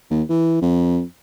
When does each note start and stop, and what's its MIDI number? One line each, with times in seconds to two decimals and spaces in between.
0.10 0.22 39
0.29 0.61 52
0.62 1.02 41